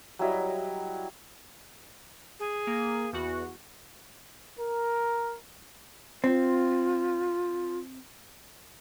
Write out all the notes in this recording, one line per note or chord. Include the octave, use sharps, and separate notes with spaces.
F#3 G3 E4 D#5
G#4
A#3
E2 F#4
A#4
C4 F4